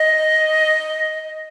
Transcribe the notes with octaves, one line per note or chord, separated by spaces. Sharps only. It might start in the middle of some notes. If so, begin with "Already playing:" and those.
Already playing: D#5